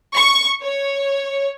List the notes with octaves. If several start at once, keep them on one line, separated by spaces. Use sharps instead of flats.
C#6
C#5